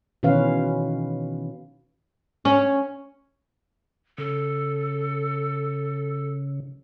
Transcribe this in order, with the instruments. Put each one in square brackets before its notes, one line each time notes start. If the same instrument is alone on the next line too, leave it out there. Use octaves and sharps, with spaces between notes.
[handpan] B2 D#3 E3 C#4 B4 F5
[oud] C#4
[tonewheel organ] C#3 [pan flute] A4